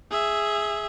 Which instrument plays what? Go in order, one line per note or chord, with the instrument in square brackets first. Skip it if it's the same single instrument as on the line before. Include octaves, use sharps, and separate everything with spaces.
[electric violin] G#4 E5